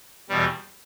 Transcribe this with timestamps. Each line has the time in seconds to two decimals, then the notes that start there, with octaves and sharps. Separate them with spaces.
0.29 E2 B2 G3